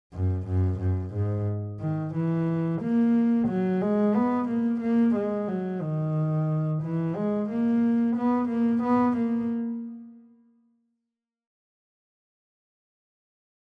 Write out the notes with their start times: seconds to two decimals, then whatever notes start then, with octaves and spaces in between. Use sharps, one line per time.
0.14 F#2
0.48 F#2
0.80 F#2
1.14 G#2
1.81 D#3
2.15 E3
2.82 A#3
3.48 F#3
3.82 G#3
4.15 B3
4.49 A#3
4.81 A#3
5.16 G#3
5.48 F#3
5.82 D#3
6.83 E3
7.16 G#3
7.50 A#3
8.16 B3
8.49 A#3
8.83 B3
9.17 A#3